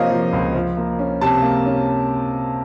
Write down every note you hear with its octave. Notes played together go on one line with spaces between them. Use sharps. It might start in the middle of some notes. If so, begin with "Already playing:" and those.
Already playing: C3 F3 A#3 C5 C#5 D#5 F5
F3
C#2
F3
A#3
C#4
C3 A5
A#3
C#4